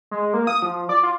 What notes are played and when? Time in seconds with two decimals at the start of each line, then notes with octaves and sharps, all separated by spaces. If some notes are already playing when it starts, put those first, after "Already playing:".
0.11 G#3
0.34 A#3
0.47 D#6
0.62 F3
0.89 D5
1.03 F4